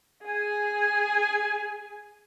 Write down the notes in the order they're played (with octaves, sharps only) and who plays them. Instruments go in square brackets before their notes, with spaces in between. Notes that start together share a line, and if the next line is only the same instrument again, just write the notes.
[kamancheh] G#4 G#5